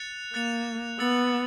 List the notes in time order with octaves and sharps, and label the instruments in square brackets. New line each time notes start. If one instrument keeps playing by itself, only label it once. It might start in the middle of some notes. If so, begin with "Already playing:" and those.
Already playing: [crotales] F#6 A6 C#7 F7
[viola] A#3 [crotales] F#6 A6 C#7 F7
[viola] B3 [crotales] E6 A6 C#7 F#7